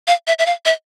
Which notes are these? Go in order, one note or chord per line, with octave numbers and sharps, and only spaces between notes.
F5
E5
E5
F5
E5